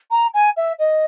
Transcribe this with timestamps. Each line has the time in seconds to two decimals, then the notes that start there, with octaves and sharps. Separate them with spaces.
0.11 A#5
0.34 G#5
0.57 E5
0.79 D#5